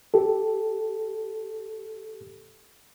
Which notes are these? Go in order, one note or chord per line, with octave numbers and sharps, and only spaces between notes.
G4 A4